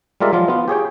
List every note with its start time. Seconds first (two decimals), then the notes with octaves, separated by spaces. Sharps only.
0.20 G3 G#3 F4 A#4 D5 E5
0.33 F3 F#3 F4
0.48 B3 F4
0.68 G4 G#4 C#5 G5